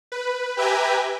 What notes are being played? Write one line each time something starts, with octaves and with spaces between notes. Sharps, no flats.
B4
G4 B4 E5 G5 G#5 A#5